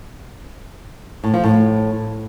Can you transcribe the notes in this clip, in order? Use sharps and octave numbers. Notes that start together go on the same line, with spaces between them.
A2
F3
A2